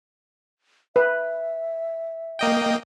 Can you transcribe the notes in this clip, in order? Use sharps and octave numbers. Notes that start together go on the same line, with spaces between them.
B4 E5
A#3 D#5 G5